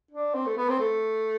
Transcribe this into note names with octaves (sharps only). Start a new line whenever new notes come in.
D4
C4
A3
B3
C4
A3